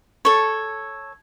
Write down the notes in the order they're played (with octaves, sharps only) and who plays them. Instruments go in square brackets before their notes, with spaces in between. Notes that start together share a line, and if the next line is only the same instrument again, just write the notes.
[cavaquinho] A4 C#5